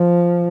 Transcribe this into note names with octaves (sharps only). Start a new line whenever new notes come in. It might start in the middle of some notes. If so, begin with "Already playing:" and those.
Already playing: F3